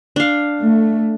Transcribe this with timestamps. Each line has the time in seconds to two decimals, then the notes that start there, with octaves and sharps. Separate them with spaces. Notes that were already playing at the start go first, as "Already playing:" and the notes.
0.16 D4 F5
0.63 A3